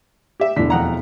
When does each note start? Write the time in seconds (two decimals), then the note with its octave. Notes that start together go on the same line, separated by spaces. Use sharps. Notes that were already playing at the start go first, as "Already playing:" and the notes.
0.40 G4 E5
0.56 E1 D3 E4 B6
0.70 F2 F#5 A#5